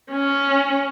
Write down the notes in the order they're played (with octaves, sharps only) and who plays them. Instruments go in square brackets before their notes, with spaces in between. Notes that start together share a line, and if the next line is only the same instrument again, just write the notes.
[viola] C#4